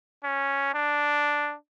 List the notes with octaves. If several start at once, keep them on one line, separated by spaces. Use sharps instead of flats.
C#4
D4